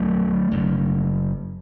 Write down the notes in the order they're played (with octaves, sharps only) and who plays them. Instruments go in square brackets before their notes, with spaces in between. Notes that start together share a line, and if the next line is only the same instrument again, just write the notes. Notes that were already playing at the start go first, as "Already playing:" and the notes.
Already playing: [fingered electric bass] B1 B2 F#3 A3
F#1 F#2